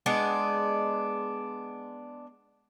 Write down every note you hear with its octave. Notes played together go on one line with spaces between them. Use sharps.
G#3 B3 D4 D#5